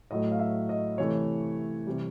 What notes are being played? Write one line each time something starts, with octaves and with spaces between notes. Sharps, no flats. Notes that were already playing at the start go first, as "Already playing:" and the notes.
A2 F#3 A3 D#5
F5
E5
D#5
C3 E3 A3 C#5
C3 E3 G3